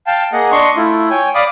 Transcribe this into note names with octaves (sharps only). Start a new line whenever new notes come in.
F5 G5 A5
A#3 G#4 D#5 F#5
D4 D#5 C6 C#6
A3 E4 F4
C#5 G5 G#5
D5 F5 B5 D6 D#6